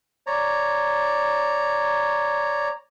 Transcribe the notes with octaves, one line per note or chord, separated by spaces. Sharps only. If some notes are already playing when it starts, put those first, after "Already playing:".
C#5 D5 A#5